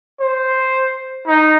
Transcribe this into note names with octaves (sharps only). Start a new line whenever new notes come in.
C5
D#4